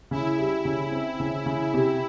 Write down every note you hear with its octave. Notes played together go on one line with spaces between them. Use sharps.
C#3 E4
G3
C#3
C4
C#3
C#3
C3